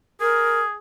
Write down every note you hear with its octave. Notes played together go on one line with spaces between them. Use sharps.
G#4 A#4